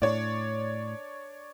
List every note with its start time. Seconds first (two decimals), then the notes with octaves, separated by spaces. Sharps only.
0.02 A2 D4 C#5 D5